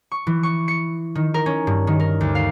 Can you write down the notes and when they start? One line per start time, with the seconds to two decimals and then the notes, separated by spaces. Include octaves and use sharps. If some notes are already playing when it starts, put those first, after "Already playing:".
0.12 C#6
0.27 E3
0.43 C#6
0.68 C#7
1.15 D#3
1.34 A#4
1.46 C#4
1.67 G2
1.87 D#3
2.00 A#4
2.21 D2
2.35 F5